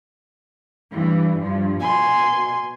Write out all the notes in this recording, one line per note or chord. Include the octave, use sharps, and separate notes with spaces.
G2 E3 G3
G2 F3
B2 G#5 C6